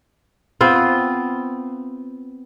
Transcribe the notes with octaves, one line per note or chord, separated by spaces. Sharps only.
B3 C4 F4